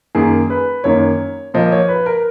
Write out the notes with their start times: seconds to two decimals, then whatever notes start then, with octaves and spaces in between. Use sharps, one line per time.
0.15 F#2 D#3 A#3 G#4
0.50 B4
0.84 F#2 D#3 A#3 C#5
1.54 A#2 F3 A#3 D#5
1.72 C#5
1.89 B4
2.06 A#4